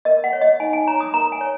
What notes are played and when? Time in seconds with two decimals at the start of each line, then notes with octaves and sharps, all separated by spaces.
0.05 A#4 D#5
0.24 F#5
0.33 C#5
0.41 D#5
0.60 D#4 G#5
0.73 G#5
0.87 C#5 A#5
1.00 D#6
1.14 A#4 A#5
1.32 G#5
1.41 C#5